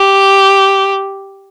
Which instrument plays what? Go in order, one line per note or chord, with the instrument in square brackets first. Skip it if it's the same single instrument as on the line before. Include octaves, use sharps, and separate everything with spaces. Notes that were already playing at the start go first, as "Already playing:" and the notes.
Already playing: [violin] G4